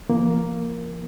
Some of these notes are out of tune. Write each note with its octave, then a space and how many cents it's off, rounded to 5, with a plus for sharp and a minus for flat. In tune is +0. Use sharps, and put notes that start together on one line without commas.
F3 -35 A#3 +0